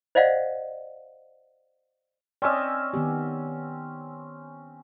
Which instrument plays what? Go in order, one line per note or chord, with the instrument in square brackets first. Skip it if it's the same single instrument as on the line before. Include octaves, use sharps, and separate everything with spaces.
[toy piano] C5 D5 D#5 F5 F#5
[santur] C4 C#4 E6 [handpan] D5 D#5
[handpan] D#3 B3 G4